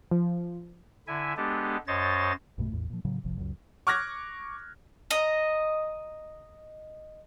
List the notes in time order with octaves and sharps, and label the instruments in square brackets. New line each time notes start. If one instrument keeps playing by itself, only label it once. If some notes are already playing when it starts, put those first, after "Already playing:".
[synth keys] F3
[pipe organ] D3 E4 E5 G#5
G#3 B3 D4 G4 A4
F#2 C5 C#5 D#5 A6
[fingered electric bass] B1 G2 B2 A3
A1 E2 A2
A#2 F3
A2 C#3 F#3
F1 A#1 C3 F3
C#2 F#2
[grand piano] C#6 D6 F6 F#6 G#6 A#6
[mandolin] D#5 A#5